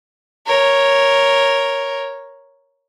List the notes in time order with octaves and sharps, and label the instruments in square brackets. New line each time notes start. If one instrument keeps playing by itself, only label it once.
[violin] A#4 C#5